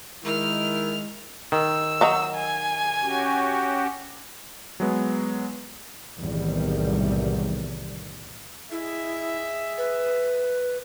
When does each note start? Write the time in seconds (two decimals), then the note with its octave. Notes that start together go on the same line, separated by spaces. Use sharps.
0.24 D#3 G#3 E4 F6
1.52 D#3 E6
2.01 F#3 D#4
2.35 G#5
3.02 C#4 F#4 G4
4.80 F#3 G#3 B3
6.18 B1 E2 A2 C3 D#3 G3
8.71 E4 G#4 D#5 E5
9.78 B4